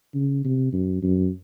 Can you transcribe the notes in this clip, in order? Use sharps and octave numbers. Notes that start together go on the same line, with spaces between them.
C#3
C3
F#2
F#2